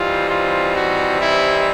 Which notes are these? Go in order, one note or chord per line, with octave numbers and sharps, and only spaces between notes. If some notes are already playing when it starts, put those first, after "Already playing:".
Already playing: C3 E3 G3 C4 D#4 F4
F4
F#4
E4